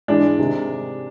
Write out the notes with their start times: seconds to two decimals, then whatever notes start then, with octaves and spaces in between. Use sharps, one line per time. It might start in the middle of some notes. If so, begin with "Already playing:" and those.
0.08 G#2 E3 G#3 D4
0.38 C3 D#3 G#3